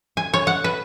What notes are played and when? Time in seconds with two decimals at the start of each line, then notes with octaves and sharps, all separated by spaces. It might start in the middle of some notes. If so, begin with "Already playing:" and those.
0.17 G#5
0.34 C#5
0.47 F#5
0.64 B4